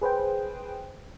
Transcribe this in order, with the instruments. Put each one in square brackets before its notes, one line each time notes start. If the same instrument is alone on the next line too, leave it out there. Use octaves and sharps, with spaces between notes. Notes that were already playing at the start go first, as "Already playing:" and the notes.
[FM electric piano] G#4 B4 C5 G5